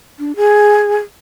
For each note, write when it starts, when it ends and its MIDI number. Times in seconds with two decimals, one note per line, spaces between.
0.19 0.32 62
0.36 0.97 68